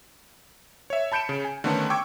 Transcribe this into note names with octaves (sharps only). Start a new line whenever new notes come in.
C#5 E5
A5 B5 G6 C#7 D7 E7
C#3
G#5
D3 D#3 A3 B3 C#4 D4
G5 C#6 D6 E6 G#6